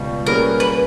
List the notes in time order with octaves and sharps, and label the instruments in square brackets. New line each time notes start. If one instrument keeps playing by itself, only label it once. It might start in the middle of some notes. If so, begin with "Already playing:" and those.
Already playing: [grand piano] C#2 B2 G3
[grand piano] G3 A#3 C#4 G#4 B4 [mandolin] A#4
[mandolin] B4